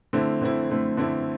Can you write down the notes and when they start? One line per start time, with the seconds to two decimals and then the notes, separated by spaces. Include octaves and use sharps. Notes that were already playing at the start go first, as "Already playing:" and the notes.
0.13 D3 A3 C4 E4
0.41 D3 A3 C4 E4
0.70 D3 A3 C4 E4
0.97 D3 A3 C4 E4